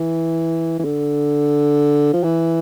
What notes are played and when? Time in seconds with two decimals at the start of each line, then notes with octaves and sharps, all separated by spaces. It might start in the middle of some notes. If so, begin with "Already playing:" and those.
Already playing: E3
0.79 E3
0.85 D3
2.13 F3
2.24 E3